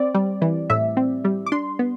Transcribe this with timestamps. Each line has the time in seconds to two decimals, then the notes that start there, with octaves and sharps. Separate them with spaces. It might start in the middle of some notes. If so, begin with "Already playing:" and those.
Already playing: C4 D5
0.14 G3
0.42 E3
0.70 A2 E5
0.97 C4
1.25 G3
1.46 D6
1.52 D4 C6
1.79 B3